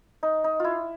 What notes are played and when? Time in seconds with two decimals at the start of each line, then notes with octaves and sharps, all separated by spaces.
0.23 D#4
0.44 D#4
0.60 E4 F4